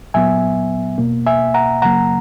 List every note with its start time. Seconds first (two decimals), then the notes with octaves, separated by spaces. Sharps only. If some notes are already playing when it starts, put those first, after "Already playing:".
0.14 A#2 F#3 B3 E5 G#5
0.98 E2 B2 A#3
1.27 E5 G#5
1.54 F#5 A#5
1.82 F#2 C#3 F#3 A#3 F#5 A#5